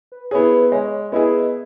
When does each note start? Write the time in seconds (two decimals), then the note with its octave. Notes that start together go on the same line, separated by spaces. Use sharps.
0.12 B4
0.31 B3 E4 G#4 C#5
0.52 B4
0.72 G#3 C#5
1.12 B3 E4 G#4 D#5